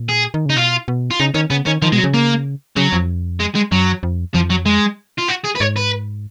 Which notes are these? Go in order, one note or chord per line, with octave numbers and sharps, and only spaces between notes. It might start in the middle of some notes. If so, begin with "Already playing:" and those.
Already playing: A#2
G#4
D#3
C#3 D#4
B2 F4
B2
F4
C#3 D#4
D#3 C#4
C#3 B3
D#3 C#4
D#3 F3
B2 G#3
F#3
C#3
A#3
C#3 F#3
F2
G#3
G#3
F#2 F#3
F2
F2 F3
F#3
G#3
F4
F#4
G#4
B4
G#2 C#5
B4